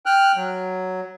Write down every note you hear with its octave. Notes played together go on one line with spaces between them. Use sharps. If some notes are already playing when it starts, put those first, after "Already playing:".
G5 F6 F#6
F#3